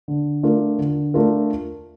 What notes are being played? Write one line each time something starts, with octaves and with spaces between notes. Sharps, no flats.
D3
A3 D4 F4 A#4
D3
A3 D4 F4 A#4